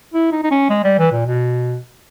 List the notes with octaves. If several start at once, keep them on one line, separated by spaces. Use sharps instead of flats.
E4
D#4
D#4
C#4
G#3
G3
E3
A#2
B2